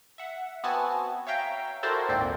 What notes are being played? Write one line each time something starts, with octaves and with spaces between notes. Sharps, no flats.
E5 F#5
B3 C4 F#4 G#5 A5
C#5 E5 F5 G5 A#5
E4 F#4 A4 A#4 C5 D5
G#1 D#2 A#2 C4 D5